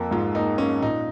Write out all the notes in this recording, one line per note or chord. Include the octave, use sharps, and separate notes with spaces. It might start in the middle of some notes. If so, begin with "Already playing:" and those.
Already playing: F2 A#3
G#2 F4
A#3 D#4
A#3 C#4
A#2 D#4